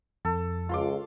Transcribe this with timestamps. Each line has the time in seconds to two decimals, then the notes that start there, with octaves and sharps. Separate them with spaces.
0.25 F2 A4
0.69 C#2 F4 C6 D6